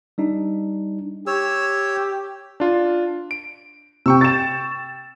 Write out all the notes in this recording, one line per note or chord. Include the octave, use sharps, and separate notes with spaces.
G3 D4 D#4
G4 C#5 E6
D4 F4
D7
C3 G5 C#6 E6
A6 E7